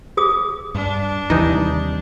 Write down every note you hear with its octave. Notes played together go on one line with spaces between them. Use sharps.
G#4 D#6
G2 D4
D#2 C3 E3 G3 D#4